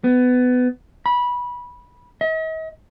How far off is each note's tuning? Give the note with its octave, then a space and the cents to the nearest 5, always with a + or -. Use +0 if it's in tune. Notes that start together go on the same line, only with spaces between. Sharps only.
B3 +20
B5 -15
D#5 +45